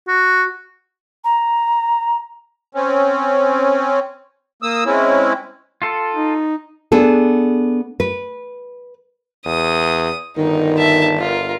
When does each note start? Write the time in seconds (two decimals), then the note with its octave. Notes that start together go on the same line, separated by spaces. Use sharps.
0.08 F#4
1.24 A#5
2.75 C4 C#4
4.62 A#3 D#6 E6
4.85 G#3 C4 C#4 E4
5.82 F4 A4
6.15 D#4
6.92 B3 D4 G#4 A4
8.00 B4
9.46 E2 D#6
10.37 G1 D#3 D#4
10.78 E5 A5
11.19 F4 A#4